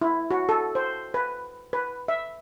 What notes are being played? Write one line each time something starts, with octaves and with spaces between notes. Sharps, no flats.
E4
F#4
A4
C5
B4
B4
E5